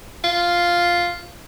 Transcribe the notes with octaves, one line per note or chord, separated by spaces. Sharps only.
F4